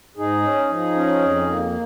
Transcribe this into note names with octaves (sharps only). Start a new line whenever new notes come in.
G#2 D#4 G#4
C#4
F3
C#4
F2
A#3